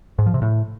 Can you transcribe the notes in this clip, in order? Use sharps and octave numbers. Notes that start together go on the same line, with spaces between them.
G#2
F3
C3
A2